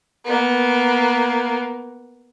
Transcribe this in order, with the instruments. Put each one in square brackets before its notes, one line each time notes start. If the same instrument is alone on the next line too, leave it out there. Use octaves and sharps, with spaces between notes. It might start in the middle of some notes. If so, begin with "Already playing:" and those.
[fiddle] A#3 B3